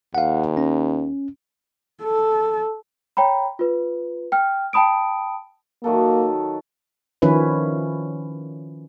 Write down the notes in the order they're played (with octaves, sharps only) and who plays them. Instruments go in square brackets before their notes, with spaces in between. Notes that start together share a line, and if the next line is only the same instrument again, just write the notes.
[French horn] D#2 [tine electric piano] F5 F#5
[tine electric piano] C#4
[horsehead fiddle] A4
[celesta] C#5 G5 A#5 B5
F4 B4
G5 F6
G5 A5 B5 D#6 D7
[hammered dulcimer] D#3 F#3 A4 [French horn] A#3
[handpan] D#3 F3 C#4 E4 B4